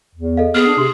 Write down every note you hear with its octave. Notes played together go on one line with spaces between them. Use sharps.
E2
A4 D#5 F5
B3 G#4 F6
D4
C3 C6